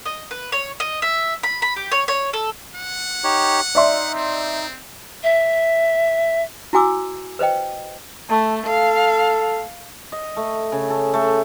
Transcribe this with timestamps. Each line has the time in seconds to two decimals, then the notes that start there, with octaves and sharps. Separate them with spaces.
0.05 D#5
0.31 B4
0.52 C#5
0.80 D#5
1.02 E5
1.43 B5
1.62 B5
1.76 G4
1.92 C#5
2.08 C#5
2.33 A4
2.75 F#5
3.24 D#4 G4 C#5
3.75 D#4 D5 E5 C6
4.15 C4
5.23 E5
6.73 E4 F#4 G#5 D6 E6
7.39 B4 C5 D#5 G5
8.29 A3 A5
8.66 A4 F5
10.12 D#5
10.37 A3
10.72 C#3
10.90 A4
11.14 A3